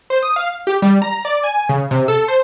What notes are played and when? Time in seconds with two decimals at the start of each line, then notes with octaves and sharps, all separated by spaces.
0.10 C5
0.23 D#6
0.36 F5
0.67 G4
0.82 G3
1.02 A#5
1.25 D5
1.44 G#5
1.69 C#3
1.91 C3
2.08 A4
2.28 C5